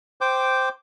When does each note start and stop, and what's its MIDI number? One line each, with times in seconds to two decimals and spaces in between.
0.21 0.69 72
0.21 0.69 79
0.21 0.69 86